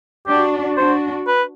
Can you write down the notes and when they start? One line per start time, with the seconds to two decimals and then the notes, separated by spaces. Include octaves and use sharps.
0.27 D4 F#4 G4
0.77 D4 F#4 C5
1.27 B4